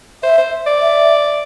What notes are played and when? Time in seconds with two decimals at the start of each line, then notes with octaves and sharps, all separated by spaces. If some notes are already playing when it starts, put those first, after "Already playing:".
0.23 C5 E5
0.38 C5
0.67 D5
0.81 E5